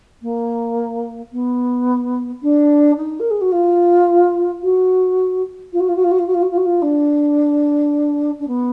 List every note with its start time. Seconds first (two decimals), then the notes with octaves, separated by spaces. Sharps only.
0.21 A#3
1.32 B3
2.42 D4
2.97 D#4
3.19 A#4
3.30 G#4
3.41 F#4
3.51 F4
4.62 F#4
5.72 F4
5.79 F#4
5.88 F4
5.95 F#4
6.03 F4
6.11 F#4
6.18 F4
6.27 F#4
6.33 F4
6.42 F#4
6.50 F4
6.57 F#4
6.65 F4
6.81 D4
8.39 D4
8.47 B3